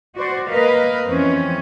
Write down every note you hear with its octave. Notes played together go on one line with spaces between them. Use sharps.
F#4 C5 D5
A#3 A#4 B4 D#5 F5
F2 E3 C4 C#4